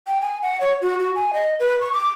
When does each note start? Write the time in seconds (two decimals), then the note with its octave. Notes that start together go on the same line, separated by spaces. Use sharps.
0.07 G5
0.21 G#5
0.42 F#5
0.61 C#5
0.82 F#4
0.99 F#4
1.15 G#5
1.33 D#5
1.60 B4
1.81 C#6
1.93 D6